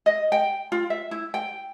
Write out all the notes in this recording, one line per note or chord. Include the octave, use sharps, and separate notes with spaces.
D#5
G5
F4
E5
E4
G5